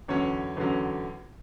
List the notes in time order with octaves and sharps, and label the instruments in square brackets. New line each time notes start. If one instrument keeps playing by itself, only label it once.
[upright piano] E2 D3 F#3 C#4 C#5
E2 D3 F#3 C#4